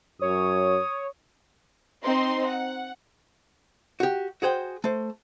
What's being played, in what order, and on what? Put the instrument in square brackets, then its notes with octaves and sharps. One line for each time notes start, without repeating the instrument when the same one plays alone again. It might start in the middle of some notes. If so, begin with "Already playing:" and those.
[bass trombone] F#2 [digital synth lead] C#5 [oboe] D#6
[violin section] C4 D#4 C6
F#5
[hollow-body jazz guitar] F#4 G4
F#4 G#4 C5 G5
A3 C5